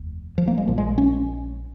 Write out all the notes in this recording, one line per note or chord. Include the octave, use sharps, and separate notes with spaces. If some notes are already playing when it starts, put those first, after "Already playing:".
Already playing: F1 D#2
F3
A#3
G#3
A#1 A#2 F3
G#3
C#4